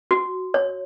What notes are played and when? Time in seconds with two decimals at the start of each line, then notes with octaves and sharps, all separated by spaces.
0.11 F#4
0.54 C#5